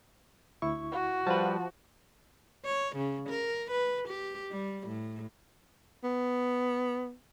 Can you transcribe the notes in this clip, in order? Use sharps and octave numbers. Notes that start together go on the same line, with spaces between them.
D2 E4 C#6
F#4
F3 G3 B4 A5
C#5
C#3
A#4
B4
G4
G3
A2
B3